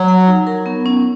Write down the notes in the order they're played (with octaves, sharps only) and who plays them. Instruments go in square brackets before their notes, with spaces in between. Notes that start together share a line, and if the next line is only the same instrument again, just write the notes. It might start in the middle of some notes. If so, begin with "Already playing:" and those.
Already playing: [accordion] F#3
[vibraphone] F#5
D#4
A#4
B3
C#4